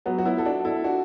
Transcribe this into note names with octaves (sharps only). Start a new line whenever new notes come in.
F#3 B3
F#4
B3 E4
A4
D4 F#4
E4 A4
D4 F#4